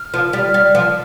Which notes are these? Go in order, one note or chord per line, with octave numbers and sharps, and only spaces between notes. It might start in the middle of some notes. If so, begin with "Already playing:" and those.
Already playing: F6
F3
G3 F6
G3
F3